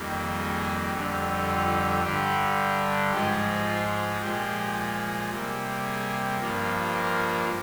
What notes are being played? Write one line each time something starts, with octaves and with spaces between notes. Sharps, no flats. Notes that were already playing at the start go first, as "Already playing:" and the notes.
Already playing: F2 D#3 G3 A#3
G#4
F2 D3 G3
F4
G2 D3 G3 G4
G#2 F3 G#3 G4
F4
A#2 F3 G#3 G4
C3 G3 A#3
G#4
G2 F3 A#3
A#4